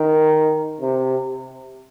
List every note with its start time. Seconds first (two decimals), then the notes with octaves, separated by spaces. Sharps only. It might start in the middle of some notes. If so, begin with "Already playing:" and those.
Already playing: D#3
0.81 C3